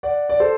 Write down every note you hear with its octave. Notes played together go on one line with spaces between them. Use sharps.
D5 F#5
D5
A4 C5